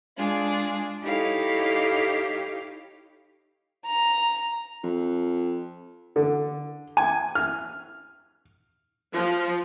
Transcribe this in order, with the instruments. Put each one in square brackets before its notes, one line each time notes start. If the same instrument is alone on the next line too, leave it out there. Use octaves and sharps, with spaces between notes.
[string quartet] G#3 D4 F4 G#4
D#4 E4 G4 A4 C#5 F5
A#5
[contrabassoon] F2
[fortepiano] D3
G#5
F6
[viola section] F3